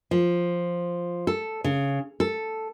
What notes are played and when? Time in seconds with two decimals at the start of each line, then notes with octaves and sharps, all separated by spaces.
0.11 F3
1.27 A4
1.64 C#3
2.20 A4